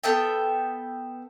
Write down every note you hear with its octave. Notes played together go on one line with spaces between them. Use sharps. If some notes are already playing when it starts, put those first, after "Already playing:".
B3 A4 E5 G5